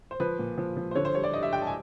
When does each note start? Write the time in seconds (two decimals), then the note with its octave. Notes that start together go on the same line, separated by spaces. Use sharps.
0.11 C5
0.20 F3 B4
0.39 A#2
0.58 F3
0.77 F3
0.91 C5
0.95 D3 C#5
1.05 C5
1.14 G3 C#5
1.24 D5
1.33 G2 D#5
1.43 E5
1.52 G2 G5
1.62 A5
1.67 G#5